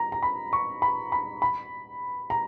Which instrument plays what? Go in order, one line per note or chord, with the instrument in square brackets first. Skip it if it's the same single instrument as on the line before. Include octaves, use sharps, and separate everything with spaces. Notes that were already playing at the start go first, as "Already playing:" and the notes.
Already playing: [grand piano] A#5
A#5
B5
C#6
B5
B5
B5
A#5